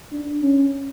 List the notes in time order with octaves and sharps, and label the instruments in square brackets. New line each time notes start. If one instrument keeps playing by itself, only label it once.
[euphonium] D4
C#4